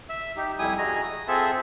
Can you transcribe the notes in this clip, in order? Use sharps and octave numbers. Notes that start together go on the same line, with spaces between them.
E5 E6
D#4 G4
F2 G3 E4 G#5 D#6
F#4 G#4 D#5 G#5 A#5
D#6
C4 F4 G#4 A4 E5 A5